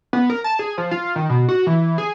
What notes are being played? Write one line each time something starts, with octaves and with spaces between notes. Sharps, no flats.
B3
A#4
A5
G#4
F3
F4
D#3
B2
F#4
E3
G#4